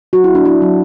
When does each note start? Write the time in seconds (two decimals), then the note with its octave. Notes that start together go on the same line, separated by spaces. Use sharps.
0.13 F#3 F#4
0.24 E4
0.30 B3
0.35 D4
0.45 D4 E4
0.62 F#3